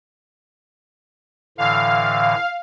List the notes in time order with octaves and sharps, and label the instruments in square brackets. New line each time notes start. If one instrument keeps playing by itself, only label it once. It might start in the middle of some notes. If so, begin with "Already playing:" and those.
[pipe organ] A2 D3 E3 [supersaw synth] F5